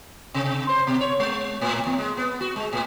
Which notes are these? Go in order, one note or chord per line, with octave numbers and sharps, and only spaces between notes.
C3
C5
B2
C#5
G#3
A2
E2
G#3
B3
F#4
G#3
A2